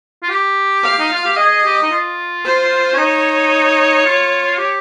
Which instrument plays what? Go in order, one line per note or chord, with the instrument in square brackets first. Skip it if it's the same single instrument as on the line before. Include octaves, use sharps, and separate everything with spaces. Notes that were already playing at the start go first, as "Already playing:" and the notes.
[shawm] F4
G4
[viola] F5
[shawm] D#4
F4
G4
[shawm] G#4 [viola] D#5
[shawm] G4
D#4
F4
[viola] C5
[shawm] C#4
[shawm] D#4 [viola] C#5
[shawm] F4
G4